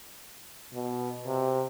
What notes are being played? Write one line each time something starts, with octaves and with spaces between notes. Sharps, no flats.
B2
C3